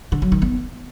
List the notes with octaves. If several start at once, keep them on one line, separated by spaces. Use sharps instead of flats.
D3
F#3
D#3
B3